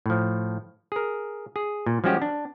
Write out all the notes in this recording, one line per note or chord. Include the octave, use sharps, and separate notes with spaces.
A2 F3
G#4 A#4
G#4
A#2
F3 G3 G#3 C#4 F#4 G4
D4